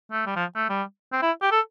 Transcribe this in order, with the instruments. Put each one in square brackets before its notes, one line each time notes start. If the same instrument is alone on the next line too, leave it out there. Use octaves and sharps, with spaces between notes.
[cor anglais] A3
G3
F3
A3
G3
C4
E4
G4
A4